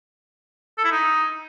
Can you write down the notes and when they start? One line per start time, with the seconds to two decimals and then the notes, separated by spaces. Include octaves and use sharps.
0.78 A4
0.84 E4
0.91 D#4